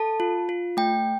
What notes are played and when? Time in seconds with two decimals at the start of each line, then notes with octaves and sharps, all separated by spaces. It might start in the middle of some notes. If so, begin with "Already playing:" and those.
Already playing: A4 A5
0.20 F4
0.49 F4
0.77 A3 G5